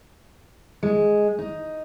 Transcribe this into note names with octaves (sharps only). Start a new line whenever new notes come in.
G#3
D#4